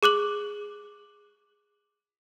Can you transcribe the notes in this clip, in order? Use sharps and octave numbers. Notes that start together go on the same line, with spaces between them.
G#4 D6 F#6 F#7